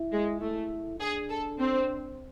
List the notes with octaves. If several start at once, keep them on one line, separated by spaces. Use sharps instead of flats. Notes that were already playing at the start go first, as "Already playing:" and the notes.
Already playing: E4
G#3
A3 E4
D4 G#4
A4
C4